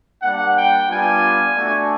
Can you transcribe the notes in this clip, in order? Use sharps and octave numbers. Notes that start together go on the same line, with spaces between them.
G3 A#3 D4 F#5
G5
G3 B3 D4 F4 G#5
A3 D4 F#4